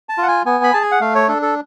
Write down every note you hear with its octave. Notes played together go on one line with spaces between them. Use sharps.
A5
F4 F#5
G#5
B3 G#5
B5
G#4 A5
G#5
F#5
A3 F5
C#5
D4 A4
A4